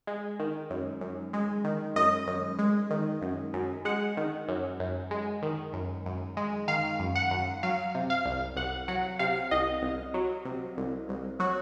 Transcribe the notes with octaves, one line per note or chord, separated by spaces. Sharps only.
G#3
D#3
F#2
F#2
G#3
D#3
F#2 D#5
F#2
G#3
D#3
F#2
F#2
G#3 F#5
D#3
F#2
F#2
G#3
D#3
F#2
F#2
G#3
D#3 F5
F#2
F#5
F#2
F#3 F5
C3
F5
C2
C2 F#5
F#3 F#5
C3 F5
C2 D#5
C2
F#3
C3
C2
C2
F#3 F#4